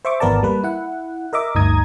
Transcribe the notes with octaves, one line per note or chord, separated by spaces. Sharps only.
C5 E5 C#6 D6
G#1 E2 B3 A#4 D5 A5
G3 A#3 B4
E4 F#5
A#4 D#5 E5 D6
G1 D2 D#4 A#5 D#6 G#6